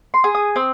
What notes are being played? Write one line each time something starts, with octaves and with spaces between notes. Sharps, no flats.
C6
G#4
D#6
C4 D#6